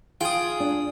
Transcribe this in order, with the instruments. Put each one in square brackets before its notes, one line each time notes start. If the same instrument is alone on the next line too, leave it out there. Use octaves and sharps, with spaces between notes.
[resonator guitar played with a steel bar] F4 G#4 [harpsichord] G5 D#6
[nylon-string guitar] D4